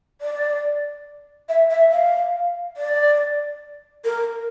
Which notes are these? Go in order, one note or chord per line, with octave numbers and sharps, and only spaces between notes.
D5
E5
E5
F5
D5
A#4